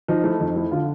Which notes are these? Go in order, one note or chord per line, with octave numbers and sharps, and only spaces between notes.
F3 D#4
A3 E4
F2 D#4
A3 E4
D3 F4